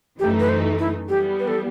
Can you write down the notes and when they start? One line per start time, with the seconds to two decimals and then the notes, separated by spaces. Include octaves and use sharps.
0.19 F#2 E3 A3 D#4 G4
0.40 B4
0.49 C5
0.79 E4
1.09 E3 G3 B3 G4
1.39 B4
1.48 A4